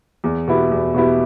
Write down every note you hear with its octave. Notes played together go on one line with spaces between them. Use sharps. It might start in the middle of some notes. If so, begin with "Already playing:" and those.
E2
B2 B3 E4 G4
E2
B2 B3 E4 G4